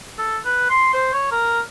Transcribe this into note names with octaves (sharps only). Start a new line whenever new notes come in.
A4
B4
C6
C5
C#5
A#4